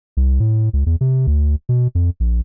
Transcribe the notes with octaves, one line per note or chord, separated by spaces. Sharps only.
C2
A2
C#2
E2
C3
D2
B2
F2
A#1